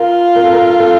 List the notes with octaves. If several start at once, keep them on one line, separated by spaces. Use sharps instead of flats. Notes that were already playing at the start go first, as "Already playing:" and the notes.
Already playing: F4 A#4
A#4
A4
A#4
A4